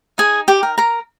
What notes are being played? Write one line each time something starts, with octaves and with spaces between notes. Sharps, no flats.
D#4 G#4 G#5
G4 G5
A#4
A#4 A#5